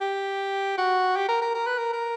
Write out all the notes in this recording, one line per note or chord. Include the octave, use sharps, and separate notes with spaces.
G4
F#4
G4
A#4
A#4
A#4
B4
A#4
A#4